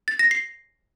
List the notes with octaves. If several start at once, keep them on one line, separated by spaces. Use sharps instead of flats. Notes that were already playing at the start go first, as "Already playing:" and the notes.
A6
A#6
C7